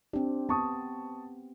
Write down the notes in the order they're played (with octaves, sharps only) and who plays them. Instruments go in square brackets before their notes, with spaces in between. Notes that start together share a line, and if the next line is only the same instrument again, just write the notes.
[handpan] C4 G4 [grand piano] D4
[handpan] B3 [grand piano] A5 C#6 D#6